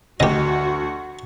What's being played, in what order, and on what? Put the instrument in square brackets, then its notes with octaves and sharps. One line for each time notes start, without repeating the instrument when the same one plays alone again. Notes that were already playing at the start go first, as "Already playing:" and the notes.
[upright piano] D2 [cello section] F#4 [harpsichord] G4 D#5